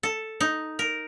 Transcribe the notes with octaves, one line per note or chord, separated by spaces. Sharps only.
A4
D#4
A#4